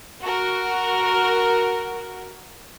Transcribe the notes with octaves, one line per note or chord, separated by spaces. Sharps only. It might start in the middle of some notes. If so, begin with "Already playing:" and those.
F#4 A#4